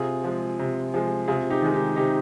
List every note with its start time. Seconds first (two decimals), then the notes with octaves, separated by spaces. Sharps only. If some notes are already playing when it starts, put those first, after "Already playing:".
Already playing: C3 F4 G#4
0.24 F3 G#3
0.59 C3
0.94 F3 G#3
1.28 C3 F4 G#4
1.50 D#4 G4
1.62 D#3 G#3
1.74 D#4 G4
1.96 C3 D#4 G4